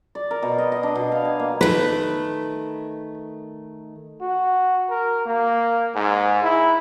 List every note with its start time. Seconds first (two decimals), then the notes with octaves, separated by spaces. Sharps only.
0.15 D5
0.31 A#4
0.42 B2
0.58 D#5
0.72 D#5
0.83 D4
0.95 B2
1.12 F5
1.25 G#5
1.39 A#3
1.61 D#3 A3 B4
4.21 F#4
4.90 A#4
5.26 A#3
5.95 G#2
6.43 E4